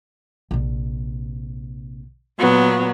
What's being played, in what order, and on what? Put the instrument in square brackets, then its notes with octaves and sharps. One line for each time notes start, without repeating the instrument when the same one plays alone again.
[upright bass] A#1 C3
[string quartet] A#2 F#3 B3